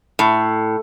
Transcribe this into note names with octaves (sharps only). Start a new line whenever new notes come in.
A2